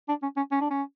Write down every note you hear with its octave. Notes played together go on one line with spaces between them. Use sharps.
D4
C#4
C#4
C#4
D4
C#4